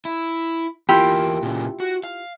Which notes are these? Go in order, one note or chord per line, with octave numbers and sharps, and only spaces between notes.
E4
E2 A#3 E4 F4 G4
A#2 C#3
F#4
F5